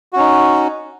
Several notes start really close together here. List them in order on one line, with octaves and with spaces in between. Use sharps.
F#4 C#4 D#4